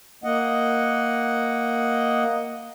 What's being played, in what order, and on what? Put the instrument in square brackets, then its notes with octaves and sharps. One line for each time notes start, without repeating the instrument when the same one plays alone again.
[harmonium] A#3 D#5 F#5